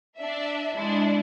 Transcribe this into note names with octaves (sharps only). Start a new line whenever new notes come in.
D4 E5
G#3 D4 E4